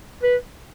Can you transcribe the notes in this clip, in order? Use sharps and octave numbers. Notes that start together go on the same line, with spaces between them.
B4